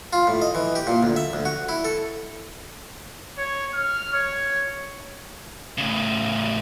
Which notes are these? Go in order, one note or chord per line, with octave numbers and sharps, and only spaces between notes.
F4
A2
D#5
E3
G4
A#2
D2
E5
D2
F#4
E4
A4
C#5
F6
C#5
A2 C#3